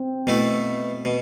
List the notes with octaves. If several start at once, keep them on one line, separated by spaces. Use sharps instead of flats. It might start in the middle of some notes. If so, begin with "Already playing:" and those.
Already playing: C4
B2 A3 B3 E4
B2